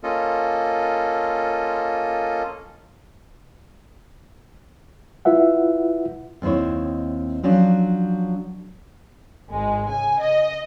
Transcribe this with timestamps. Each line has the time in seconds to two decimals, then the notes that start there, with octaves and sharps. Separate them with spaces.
0.03 A#3 C#4 F4 A4 D#5
5.25 E4 F4 B4 E5 F#5
6.42 D#2 C4 D#4 E4 C#5
7.43 F3 F#3 C#4 D4
9.50 G#1 G#3
9.90 C#3 G#5
10.22 D#5